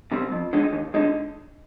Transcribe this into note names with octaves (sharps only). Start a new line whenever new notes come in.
C3 G3 C4
F2
D3 G#3 D#4
D#2
D3 G#3 D#4